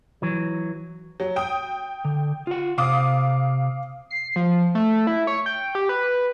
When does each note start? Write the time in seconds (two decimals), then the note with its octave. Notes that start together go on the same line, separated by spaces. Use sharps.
0.22 E3 F#3
1.20 F#3
1.36 G5 D#6
2.05 D3
2.47 F4 F#5
2.78 C3 F5 D6 D#6
4.11 C7
4.36 F3
4.75 A3
5.07 E4
5.27 C#5
5.46 G5
5.75 G4
5.89 B4